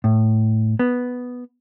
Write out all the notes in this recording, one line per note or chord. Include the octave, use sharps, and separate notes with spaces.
A2
B3